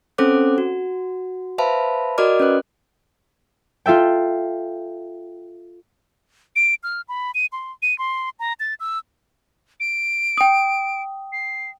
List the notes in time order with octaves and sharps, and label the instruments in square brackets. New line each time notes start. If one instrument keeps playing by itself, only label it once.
[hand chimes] C4 C#4 A4 C5 D6 F#6
F#4
B4 C5 E5 F5 A5 B5
F#4 A#4 D5 D#5 D6 F6
C#4 B4 F#6
[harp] F4 A4 E5 G5
[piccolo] D7
F6
B5
D#7
C6
D#7
C6
A#5
A6
E6
D7
[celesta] G5 D#6
[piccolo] C7